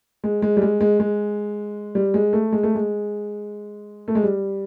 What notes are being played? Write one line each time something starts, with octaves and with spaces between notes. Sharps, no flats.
G#3
G#3
G3
G#3
G#3
G#3
G3
G#3
A3
G#3
A3
G#3
A3
G#3
G3